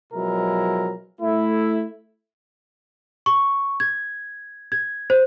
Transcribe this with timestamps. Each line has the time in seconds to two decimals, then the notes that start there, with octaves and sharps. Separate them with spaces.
0.13 B2 F3 F#3 G#3 E4 A#4
1.22 A3 E4
3.26 C#6
3.80 G#6
4.72 G#6
5.10 C5